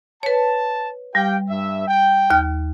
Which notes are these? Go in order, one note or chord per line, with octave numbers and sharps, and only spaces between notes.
B4 C#5 A5
G3 G4 F5 G5
G2 E5
G5
D#2 F6